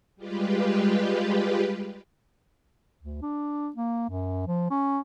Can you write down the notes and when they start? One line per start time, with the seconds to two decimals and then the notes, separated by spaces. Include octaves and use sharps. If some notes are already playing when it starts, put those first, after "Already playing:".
0.16 G3 G#3 F4 G4 B4
3.03 D2
3.22 D4
3.76 A#3
4.09 F#2
4.47 F3
4.70 C#4